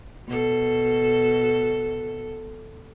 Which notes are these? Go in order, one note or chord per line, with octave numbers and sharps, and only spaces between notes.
B2 A4